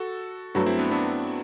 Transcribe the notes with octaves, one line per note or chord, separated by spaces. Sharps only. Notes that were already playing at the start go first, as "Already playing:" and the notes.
Already playing: F#4 A4
G2 F#3 A3 D4 F#4
C4 E4
B3 D4
B3 D4